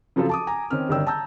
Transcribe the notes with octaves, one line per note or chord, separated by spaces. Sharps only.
C#3 F3 F#3 F4 A4
A5 D6 D#6
G#5 A#5
D#3 C4 C#4 F6
G1 D#3 D5 G5 E6
A5 A#5 E6 G6